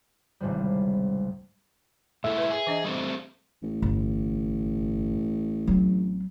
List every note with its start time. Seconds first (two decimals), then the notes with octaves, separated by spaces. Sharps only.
0.40 G#1 C#2 G#2 C3 G3
2.24 G#2 E4 A4 E5
2.38 B4 C6
2.51 G#4
2.67 E3 D4 D#5
2.84 G3 A3 C4
3.62 A1
3.82 G1
5.67 F#3 C4